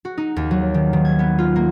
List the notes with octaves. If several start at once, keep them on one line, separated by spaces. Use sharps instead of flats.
F#4
D#4
D#2
F#3
D#3
D#3
G#6
B3
F4
A#3